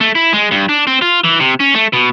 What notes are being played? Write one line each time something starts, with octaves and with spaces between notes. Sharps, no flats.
A3
E4
G#3
G2
D4
C4
F4
E3
C3
C#4
A3
B2